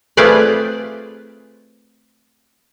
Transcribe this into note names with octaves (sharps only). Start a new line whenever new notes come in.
A3 C4 F4 G#4 B4 D5